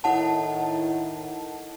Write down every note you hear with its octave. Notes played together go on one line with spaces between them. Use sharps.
A2 D#3 E4 F#5 A5